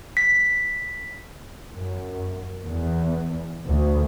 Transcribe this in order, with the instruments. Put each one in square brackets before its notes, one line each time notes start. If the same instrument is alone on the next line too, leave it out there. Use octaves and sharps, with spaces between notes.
[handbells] B6
[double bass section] F#2
E2
D2